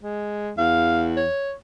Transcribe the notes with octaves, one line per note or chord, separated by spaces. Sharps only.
G#3
E2 F5
C#5